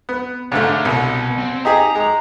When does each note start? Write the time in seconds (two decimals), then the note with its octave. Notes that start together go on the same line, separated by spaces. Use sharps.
0.09 B3
0.52 G#2 D3 A3 C#5 F5
0.85 C2 B2
1.38 C4
1.65 D#4 G4 G#4 A#5
1.95 G#3